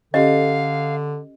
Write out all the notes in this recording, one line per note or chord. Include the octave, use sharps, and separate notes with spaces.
D3 C#4 G4 A4 D#5 F5